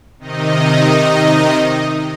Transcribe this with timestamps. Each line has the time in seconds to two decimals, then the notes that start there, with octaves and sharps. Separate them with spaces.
0.19 C3 D#3 D#4 D#5